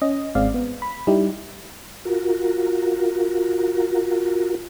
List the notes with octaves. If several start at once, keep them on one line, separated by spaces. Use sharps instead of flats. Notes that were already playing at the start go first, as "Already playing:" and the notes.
C#4 D#5
G#1 G#3 C4 D5 F5
B3
B5
G3 D#4 E4 G4
F4 F#4 A#4